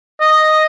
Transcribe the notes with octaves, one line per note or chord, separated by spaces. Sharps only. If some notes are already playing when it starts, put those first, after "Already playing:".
D#5